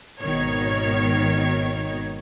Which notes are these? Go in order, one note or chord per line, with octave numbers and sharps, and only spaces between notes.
G#1 B2 D#3 C#5 G#6